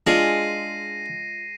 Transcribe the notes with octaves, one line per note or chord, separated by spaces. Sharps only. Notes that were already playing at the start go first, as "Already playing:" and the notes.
G#3 D4 F4 G#4 A#6 C7 D#7